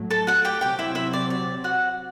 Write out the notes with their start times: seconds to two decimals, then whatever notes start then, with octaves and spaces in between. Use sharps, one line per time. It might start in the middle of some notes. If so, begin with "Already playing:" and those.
Already playing: A2 F#3 A3
0.10 A4 A5
0.27 F#4 F#5
0.45 G4 G5
0.61 C3 F#3 C4 G4 G5
0.79 E4 E5
0.95 E4 E5
1.13 D5
1.30 D5
1.64 F#4 F#5